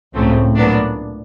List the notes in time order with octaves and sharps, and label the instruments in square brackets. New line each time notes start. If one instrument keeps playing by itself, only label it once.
[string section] C#2 C#3 F#3 A3 C4 [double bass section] A2
[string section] A#2 F#3 B3 D4